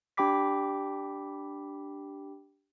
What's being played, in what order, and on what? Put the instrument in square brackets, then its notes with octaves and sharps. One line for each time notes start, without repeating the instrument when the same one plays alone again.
[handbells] D4 G4 G5 B5 D6 B6